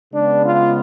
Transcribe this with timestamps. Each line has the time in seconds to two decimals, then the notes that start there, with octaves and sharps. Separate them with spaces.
0.12 C#3 G#3 B3 D4
0.44 F4